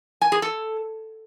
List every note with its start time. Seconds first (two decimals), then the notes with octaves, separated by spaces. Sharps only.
0.21 G#5
0.32 G#4
0.42 A4